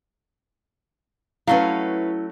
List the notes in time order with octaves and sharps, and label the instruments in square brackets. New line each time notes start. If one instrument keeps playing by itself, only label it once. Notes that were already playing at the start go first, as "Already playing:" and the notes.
[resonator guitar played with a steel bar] F#3 A3 C#4 [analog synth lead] E4 [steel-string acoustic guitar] B4 F5